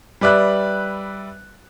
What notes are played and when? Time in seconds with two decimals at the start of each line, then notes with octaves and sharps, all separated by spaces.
0.21 G3 B4 D5 E5 F#6